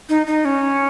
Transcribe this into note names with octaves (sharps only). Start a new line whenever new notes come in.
D#4
D#4
C#4